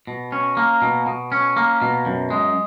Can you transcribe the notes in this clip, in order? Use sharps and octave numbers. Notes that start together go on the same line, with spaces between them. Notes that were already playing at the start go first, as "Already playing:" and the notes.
B2
C#4
A#3
B2
B2
C#4
A#3
B2
F#2
G#3